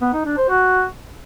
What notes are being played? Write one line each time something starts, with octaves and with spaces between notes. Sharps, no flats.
B3
D#4
D4
C5
F#4